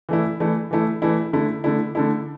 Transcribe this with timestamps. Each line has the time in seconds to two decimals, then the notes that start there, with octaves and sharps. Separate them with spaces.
0.09 E3 A3 E4
0.40 E3 A3 E4
0.71 E3 A3 E4
1.02 E3 A3 E4
1.33 D3 A3 E4
1.64 D3 A3 E4
1.95 D3 A3 E4